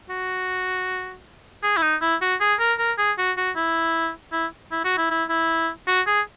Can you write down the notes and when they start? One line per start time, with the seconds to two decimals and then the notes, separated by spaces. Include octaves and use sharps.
0.10 F#4
1.63 G#4
1.77 E4
1.82 D#4
2.02 E4
2.22 F#4
2.41 G#4
2.60 A#4
2.79 A#4
2.98 G#4
3.18 F#4
3.37 F#4
3.56 E4
4.33 E4
4.72 E4
4.85 F#4
4.98 E4
5.11 E4
5.29 E4
5.87 F#4
6.07 G#4